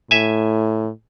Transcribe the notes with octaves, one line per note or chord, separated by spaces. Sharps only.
A2 E5 G#5